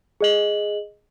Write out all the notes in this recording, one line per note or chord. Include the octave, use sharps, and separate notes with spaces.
G#4 D#5 F#7